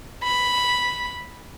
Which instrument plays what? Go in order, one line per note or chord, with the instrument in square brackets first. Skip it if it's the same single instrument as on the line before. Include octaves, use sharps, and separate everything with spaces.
[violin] B5